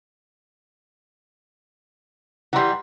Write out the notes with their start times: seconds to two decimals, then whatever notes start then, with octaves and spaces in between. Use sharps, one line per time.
2.53 E3 G3 F#5 A#5 C6